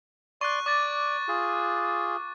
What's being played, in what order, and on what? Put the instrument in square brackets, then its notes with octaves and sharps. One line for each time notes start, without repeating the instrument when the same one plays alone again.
[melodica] D5 C6 [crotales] C#6 F#6
[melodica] D5 [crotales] D6 A6
[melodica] F4 G#4